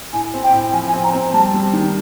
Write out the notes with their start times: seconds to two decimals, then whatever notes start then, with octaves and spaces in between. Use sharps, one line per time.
0.13 A2 G#5
0.34 C4
0.43 G5
0.53 A2
0.73 F3 G#5
0.88 G#5
0.93 C4
1.04 A#5
1.14 C4
1.33 G3 A5
1.54 G3
1.73 D#3